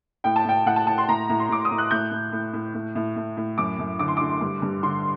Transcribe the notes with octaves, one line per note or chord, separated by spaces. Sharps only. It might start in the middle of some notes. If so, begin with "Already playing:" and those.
A2 G5
A5
A2 G5
A2 F#5
A5
A2 A5
C6
A2 A#5
A2
C6
A2 D6
D#6
A2
F#6
A2 G6
A2
A2
A2
A2
A2
A2
A2
F#2 D6
F#2
D3 D6
C6
D3 D6
G2
G2
D3 C6